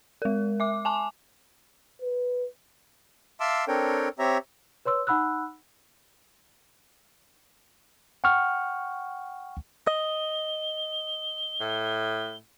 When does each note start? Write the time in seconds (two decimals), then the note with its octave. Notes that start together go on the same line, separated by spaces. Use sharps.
0.22 G#3 A#4
0.60 E5 D6
0.85 G#5 A5 D6
2.02 B4
3.40 E5 F5 A5 C6 D6 E6
3.68 C4 D4 A4 A#4 C#5 G5
4.19 C4 G4 C#5 E5 A#5
4.85 B4 C#5 C6 E6
5.07 D#4 F#5 B5 E6 F#6
8.24 F#5 G5 C#6 F6
9.87 D#5 G7
11.61 A2